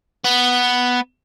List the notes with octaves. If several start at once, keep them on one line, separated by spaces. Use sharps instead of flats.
B3